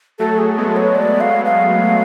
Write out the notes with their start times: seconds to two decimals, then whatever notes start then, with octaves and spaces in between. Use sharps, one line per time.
0.19 F#3 A3 A4
0.38 G#4
0.57 G#3 B3 A4
0.76 C#5
0.95 D5
1.20 F5
1.45 F5